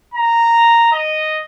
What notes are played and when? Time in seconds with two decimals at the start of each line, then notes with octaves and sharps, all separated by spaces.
0.14 A#5
0.92 D#5